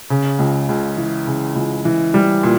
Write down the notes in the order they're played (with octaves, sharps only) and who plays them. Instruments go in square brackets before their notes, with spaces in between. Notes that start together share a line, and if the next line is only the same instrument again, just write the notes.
[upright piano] C#3
C#2
C#2
E3
C#3
C#2
E3
G3
A#2